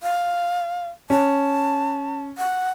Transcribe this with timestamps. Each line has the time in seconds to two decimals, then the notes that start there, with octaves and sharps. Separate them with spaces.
0.03 F5
1.10 C#4 A5
2.38 F#5